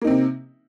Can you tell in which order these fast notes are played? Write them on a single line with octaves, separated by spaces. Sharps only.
A#3 D#4 C4 C3